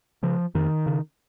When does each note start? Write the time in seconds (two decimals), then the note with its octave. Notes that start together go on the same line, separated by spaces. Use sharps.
0.23 C#3 F3
0.55 F2 D#3
0.86 C#3